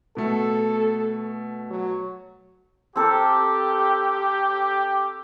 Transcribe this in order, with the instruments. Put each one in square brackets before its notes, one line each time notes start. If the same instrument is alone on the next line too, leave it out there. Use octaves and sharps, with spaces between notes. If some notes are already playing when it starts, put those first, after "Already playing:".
[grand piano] B2 A3 [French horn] A4
[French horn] F#3
[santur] C4 A4 A#4 [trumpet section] G4